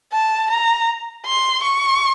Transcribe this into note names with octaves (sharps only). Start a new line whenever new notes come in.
A5
A#5
C6
C#6